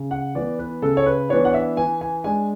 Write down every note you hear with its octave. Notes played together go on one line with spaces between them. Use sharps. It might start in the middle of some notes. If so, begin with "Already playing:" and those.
Already playing: C#3
F#5
E3 B3 D5
B4
C#3 A4
C#5
B4
E3 B3 D4 C#5
F#5
E5
E3 G#5
G#5
G#3 D4 G#5